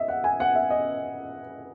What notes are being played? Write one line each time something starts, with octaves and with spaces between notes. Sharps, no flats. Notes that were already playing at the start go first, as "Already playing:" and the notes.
Already playing: D#5 E5
F#5
G#5
F#5
E5
D#5